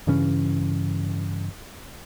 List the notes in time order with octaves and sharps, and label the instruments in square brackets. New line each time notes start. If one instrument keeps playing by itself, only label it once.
[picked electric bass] G2 C#3 E3 C#4